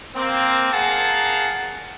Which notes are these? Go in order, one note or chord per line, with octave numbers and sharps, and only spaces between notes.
A#3 C4
G#4 A#4 F5 F#5 G#5 A5